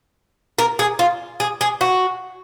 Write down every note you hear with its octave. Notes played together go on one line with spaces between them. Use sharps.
A#4
G#4
F4
G#4
G#4
F#4